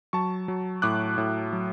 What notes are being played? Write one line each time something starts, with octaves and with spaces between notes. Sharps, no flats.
F#3 A5 C#6
F#3
A2 D6 F#6
A2
F#3